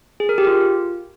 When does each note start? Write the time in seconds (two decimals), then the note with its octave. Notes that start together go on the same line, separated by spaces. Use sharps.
0.20 G#4
0.29 A#4
0.38 G4
0.47 F4